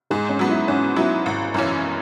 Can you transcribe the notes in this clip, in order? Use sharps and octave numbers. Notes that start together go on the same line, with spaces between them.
G#2 G#3
C#4
F#3 B3
E4
G#2 C#4
F#3 B3 E4
G#1
F#2 E3 C#4